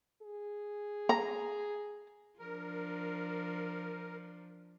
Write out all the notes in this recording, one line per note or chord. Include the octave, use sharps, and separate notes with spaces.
G#4
A#5
F3 D4 A#4